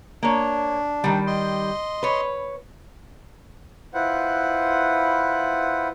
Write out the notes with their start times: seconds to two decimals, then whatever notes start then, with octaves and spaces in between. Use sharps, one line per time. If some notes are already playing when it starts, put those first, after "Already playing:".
0.23 A#3 D4 C#5
1.04 D#3 G3
1.27 D#5 C6
2.03 B4 C#5
3.94 E4 F4 B4 C5 F#5